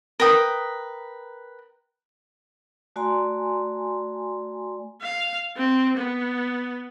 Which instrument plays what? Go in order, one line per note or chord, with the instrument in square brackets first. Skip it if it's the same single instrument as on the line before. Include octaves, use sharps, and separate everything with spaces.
[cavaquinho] A#4 B4 G5 D#6
[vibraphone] A3 F#4 D5 G#5 A#5 C6
[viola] F5
C4
B3